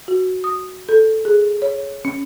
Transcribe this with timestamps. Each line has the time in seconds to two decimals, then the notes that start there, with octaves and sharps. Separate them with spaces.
0.08 F#4
0.44 D#6
0.89 A4
1.25 G#4
1.62 C#5
2.05 C#4